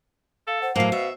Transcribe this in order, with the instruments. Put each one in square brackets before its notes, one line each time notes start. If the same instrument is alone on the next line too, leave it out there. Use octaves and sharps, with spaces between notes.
[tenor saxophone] A4 [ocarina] F5
[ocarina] C5 [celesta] F#5
[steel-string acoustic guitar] A2 F#3 [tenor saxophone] A#3 [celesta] C5 C7 [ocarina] F5
[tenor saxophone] B2 [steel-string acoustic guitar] E5